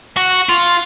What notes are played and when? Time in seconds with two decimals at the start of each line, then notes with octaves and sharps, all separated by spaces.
0.17 F#4
0.49 F4